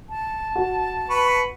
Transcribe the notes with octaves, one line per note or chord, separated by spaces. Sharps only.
A5
F#4
B4 B5 C#6